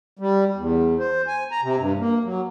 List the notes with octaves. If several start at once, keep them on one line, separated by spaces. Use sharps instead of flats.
G3
E2
C5
G#5
A#5
C3
G2
A#3
F#3